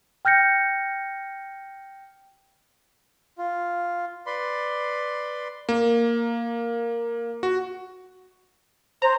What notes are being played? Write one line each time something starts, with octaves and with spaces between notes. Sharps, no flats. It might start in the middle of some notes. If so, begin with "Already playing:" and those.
G5 F6 G6 A#6 C#7
F4
B4 D5 B5 C6
A#3
F#4
C5 A#5